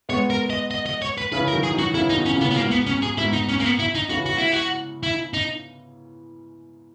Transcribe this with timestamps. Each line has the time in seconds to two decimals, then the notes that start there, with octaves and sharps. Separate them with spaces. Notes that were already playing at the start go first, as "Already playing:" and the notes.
0.09 G#3 B3 C#5
0.30 A#4
0.50 D#5
0.71 D#5
0.86 D#5
1.02 C#5
1.18 B4
1.32 C#3 E3 B4
1.48 A#4
1.53 D#3 F#3
1.63 G#4
1.73 D#3 F#3
1.79 F#4
1.94 C#3 E3 E4
2.09 D#4
2.15 B2 D#3
2.25 C#4
2.35 A#2 C#3
2.41 B3
2.51 B3
2.56 G#2 B2 A#3
2.71 B3
2.86 C#4
3.02 G#4
3.17 G#2 B2 E4
3.33 D#4
3.49 C#4
3.60 A#3
3.64 B3
3.79 E4
3.95 D#4
4.09 C#3 E3 F#4
4.26 F#4
4.38 E4
4.52 F#4
5.03 E4
5.34 D#4